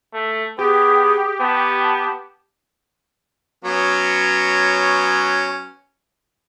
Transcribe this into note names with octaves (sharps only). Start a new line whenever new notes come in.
A3
B3 G4 G#4
B3 A5
F#3 B3 C#4